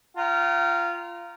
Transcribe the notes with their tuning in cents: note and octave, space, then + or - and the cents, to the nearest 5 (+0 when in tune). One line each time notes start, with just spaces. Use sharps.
F4 -15 G5 -45 A#5 +0